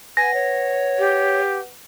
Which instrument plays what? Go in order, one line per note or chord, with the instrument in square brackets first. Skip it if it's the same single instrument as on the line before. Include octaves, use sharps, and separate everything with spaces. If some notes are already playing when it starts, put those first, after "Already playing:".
[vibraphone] B4 F#5 [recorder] G#5 [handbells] A#6
[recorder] C#5
[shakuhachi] G4